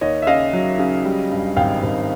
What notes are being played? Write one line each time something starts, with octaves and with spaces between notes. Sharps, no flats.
D#2 C#5 D#5
E5
C#3 D#5 F5
F#3
C#3
G3
G2
G#1 F5 G5
G#1